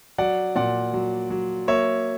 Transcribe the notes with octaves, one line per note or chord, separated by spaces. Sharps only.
F#3 D5 F#5
A#2 D5 F#5
F#3
F#3
A#3 C#5 E5